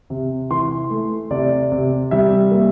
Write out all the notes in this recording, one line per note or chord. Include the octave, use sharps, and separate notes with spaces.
C3
E3 C6
A3
C3 D5
C3
G3 E5
A#3